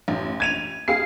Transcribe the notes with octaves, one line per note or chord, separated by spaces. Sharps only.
A1
G#6 D#7 F7
G#4 F5 C7